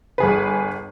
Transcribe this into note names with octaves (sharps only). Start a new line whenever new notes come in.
G1 G#4 B4